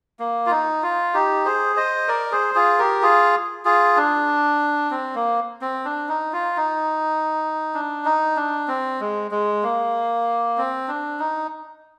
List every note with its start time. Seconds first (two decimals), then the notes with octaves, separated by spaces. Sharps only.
0.19 A#3
0.46 F4
0.50 D#4
0.83 F4
1.14 D#4 G4
1.45 G#4 C5
1.76 C5 D#5
2.08 A#4 D5
2.31 G#4 C5
2.55 F4 G#4
2.79 G4 A#4
3.02 F4 G#4
3.65 F4 G#4
3.97 D4
4.90 C4
5.15 A#3
5.61 C4
5.85 D4
6.09 D#4
6.33 F4
6.57 D#4
7.74 D4
8.05 D#4
8.36 D4
8.68 C4
9.00 G#3
9.31 G#3
9.63 A#3
10.58 C4
10.88 D4
11.19 D#4